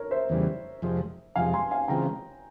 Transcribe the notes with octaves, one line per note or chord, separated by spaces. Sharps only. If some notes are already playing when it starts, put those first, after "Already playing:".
Already playing: A#4 C#5
C5 E5
E2 C#3 E3 G3
F2 C3 F3 G#3
F2 C3 F3 G#3 F5 G#5
G#5 C6
F5 G#5
C#3 E3 G#3 C4 F4 G5 A#5